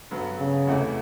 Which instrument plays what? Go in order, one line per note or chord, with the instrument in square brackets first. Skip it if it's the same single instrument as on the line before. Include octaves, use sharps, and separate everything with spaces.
[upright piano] G2 D3 F#3 B3
[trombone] C#3
[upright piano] E2 C3 E3 A3